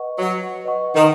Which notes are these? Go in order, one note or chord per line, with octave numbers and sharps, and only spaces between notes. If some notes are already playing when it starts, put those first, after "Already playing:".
Already playing: B4 D#5 F#5 C#6
F#3
B4 D#5 F#5 C#6
D#3